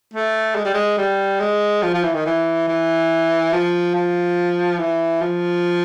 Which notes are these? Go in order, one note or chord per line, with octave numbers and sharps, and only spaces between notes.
A3
G#3
G3
G#3
G3
G#3
F3
F3
E3
D#3
E3
E3
F3
F3
E3
F3